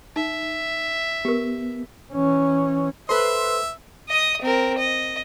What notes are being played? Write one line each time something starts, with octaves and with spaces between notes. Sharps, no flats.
D#4 E5
B3 G4 A#4
E3 C#4
A4 B4 C5 E5 C6
D#5 D#6
C4 A#4
D#5